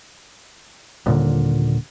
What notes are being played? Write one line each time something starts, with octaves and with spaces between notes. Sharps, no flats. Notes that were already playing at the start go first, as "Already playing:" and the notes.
D#1 A#2 D3